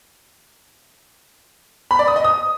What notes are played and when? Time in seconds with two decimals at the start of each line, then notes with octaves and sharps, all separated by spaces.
1.91 B5
1.99 D5
2.08 D#6
2.16 D#5
2.24 D#6